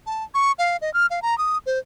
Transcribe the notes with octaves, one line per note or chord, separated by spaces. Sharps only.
A5
C#6
F5
D#5
F6
F5
A#5
D#6
C5